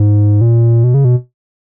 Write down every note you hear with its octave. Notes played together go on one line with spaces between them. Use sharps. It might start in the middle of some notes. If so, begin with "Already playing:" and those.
Already playing: G#2
A#2
B2
C#3
B2